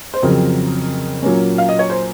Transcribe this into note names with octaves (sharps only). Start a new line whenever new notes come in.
C5
F2 C#3 F#3 C4 A#4
A#2 F#3 A#3 C#4
F5
D#5
C#5
C5